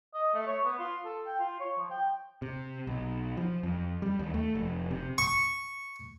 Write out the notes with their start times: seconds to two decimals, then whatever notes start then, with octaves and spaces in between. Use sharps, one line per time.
0.14 D#5
0.34 A3
0.47 C#5
0.65 B3
0.79 F4
1.05 A4
1.26 G5
1.39 F4
1.60 C#5
1.79 F3
1.91 G5
2.42 C3
2.87 B1
3.37 F3
3.63 F2
4.02 G3
4.19 D#2
4.34 A3
4.55 F1
4.91 C3
5.18 C#6